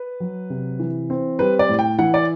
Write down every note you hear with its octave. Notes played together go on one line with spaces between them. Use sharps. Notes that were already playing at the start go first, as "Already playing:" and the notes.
Already playing: B4
F#3
C3
E3
C4
G3 B4
D5
A2
G5
E3 F#5
D5